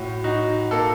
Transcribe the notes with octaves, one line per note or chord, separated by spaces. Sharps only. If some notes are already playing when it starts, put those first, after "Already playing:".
Already playing: A2 F#4
D#4 F#4
A#3 A4